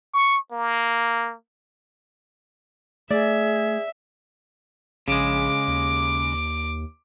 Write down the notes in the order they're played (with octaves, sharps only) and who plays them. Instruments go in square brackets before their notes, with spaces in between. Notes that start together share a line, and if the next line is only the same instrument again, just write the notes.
[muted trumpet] C#6
A#3
[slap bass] A3 [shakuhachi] G#4 [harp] D5 [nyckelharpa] E5
[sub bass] A#1 [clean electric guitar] C#3 G#3 [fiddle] D6
[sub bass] D#2